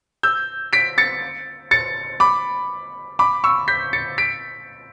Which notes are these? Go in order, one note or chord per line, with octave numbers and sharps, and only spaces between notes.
E6 G6
B6 D7
A6 C#7
A6 C#7
B5 D6
B5 D6
C#6 E6
G6 B6
A6 C#7
B6 D7